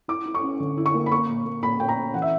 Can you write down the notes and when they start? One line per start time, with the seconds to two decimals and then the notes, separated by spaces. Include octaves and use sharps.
0.08 E4 D6
0.26 E4
0.34 C#6
0.43 C#4
0.60 D3
0.77 E4
0.86 C#6
0.94 A#3
1.06 B5
1.12 A#3 C#6
1.29 A#2
1.45 A#3
1.63 A#2 B5
1.80 A#2 G5
1.88 A#5
1.97 C#4
2.14 E3 F#5
2.22 E5